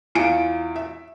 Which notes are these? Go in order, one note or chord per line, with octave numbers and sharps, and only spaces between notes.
E2 E4 F4 G#5 C#7 D7
E5